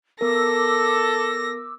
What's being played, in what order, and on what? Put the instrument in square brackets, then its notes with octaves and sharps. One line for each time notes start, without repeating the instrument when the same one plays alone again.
[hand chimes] B3 A#4 [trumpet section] A4 [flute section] D6 E6 [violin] A#6